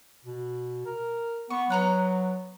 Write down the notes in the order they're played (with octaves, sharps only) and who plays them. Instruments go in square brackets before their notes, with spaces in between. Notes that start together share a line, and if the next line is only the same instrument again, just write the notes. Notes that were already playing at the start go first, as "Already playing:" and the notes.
[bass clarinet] B2
A#4
[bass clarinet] B3 [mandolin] C#6
[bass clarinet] F#3 [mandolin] B3 A#5 F#6